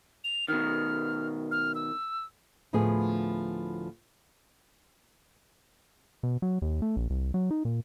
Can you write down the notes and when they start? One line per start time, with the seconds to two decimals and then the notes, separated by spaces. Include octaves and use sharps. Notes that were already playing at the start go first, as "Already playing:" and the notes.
0.24 F7
0.48 B2 D#3 F6
1.51 F6
1.75 E6
2.73 D2 A2 F3 B3 G#4
6.23 B2
6.42 F#3
6.62 D#2
6.82 A3
6.96 A#1
7.10 C2
7.34 F#3
7.51 D#4
7.65 A#2